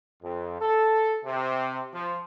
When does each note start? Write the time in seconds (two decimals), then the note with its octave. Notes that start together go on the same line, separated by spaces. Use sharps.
0.23 F2
0.59 A4
1.25 C3
1.93 F3